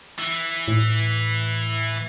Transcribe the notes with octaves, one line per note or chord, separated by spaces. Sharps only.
E3
A2